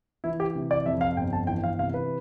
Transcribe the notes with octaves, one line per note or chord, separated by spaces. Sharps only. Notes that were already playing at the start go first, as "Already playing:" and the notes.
E3 E4
G4
C3
D5
F2 E5
F5
G1 G5
A5
E3 G5
F5
C3 F5
B4